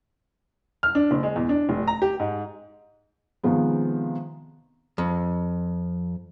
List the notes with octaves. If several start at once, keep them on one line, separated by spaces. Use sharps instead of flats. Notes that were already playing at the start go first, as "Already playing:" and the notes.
F6
D4
F#1
G#3
E2
D4
F1
A#5
G4
G#2
C3 D#3 F3 G#3 B3
F2